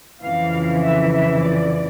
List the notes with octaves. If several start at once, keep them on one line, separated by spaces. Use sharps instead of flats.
F2 C#3 E3 F5
E5
E5
D5